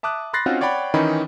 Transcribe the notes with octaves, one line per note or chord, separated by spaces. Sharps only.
E5 A5 D6 D#6 F#6
B5 C6 F#6 A6 A#6 C7
C4 C#4 D#4 F4 F#4
C#5 D5 F#5 G5 B5
D#3 E3 C#4 D#4 B5